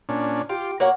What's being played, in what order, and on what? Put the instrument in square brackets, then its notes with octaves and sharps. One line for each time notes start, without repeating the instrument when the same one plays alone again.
[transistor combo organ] A#2 C#4 D4
[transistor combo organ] F4 [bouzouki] G4
[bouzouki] A#3 C#5 F#5 [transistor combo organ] F#4